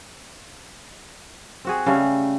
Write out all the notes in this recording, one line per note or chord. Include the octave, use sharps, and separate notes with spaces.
C4 F#4 G#4
C#3 G3 A3